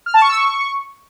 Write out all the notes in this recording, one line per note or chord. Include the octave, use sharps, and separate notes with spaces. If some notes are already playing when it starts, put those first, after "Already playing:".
F6
A5
C#6
E6
C#6